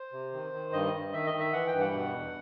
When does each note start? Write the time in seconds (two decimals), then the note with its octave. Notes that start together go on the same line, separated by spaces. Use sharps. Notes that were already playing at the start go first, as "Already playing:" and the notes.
Already playing: C5
0.12 C3
0.33 D#3
0.53 D#3
0.73 G2 D#5
0.93 G2
1.13 D#3 E5
1.26 D#5
1.34 D#3
1.40 E5
1.53 E3 F#5
1.67 G5
1.74 G2
1.80 F#5
1.94 B2
2.14 E2